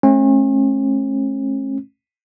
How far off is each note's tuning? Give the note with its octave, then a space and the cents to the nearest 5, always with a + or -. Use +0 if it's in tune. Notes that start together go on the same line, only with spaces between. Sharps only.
A3 -30 C#4 -40